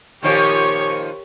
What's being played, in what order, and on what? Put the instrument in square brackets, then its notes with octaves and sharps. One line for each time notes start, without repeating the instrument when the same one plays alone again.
[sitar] A#2 D#3 F3 [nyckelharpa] G4 C#5 [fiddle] A#4 C#6